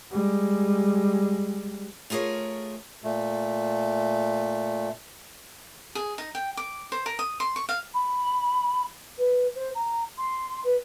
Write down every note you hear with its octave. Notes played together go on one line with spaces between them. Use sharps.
G3 G#3
A3 F4 G#4 A#4 C#5
A#2 A3
G#4
D#4
G5
D6
C5
A#4
D#6
C6
C#6
F5
B5
B4
C5
A#5
C6
B4